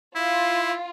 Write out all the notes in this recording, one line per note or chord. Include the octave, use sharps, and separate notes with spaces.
E4 F4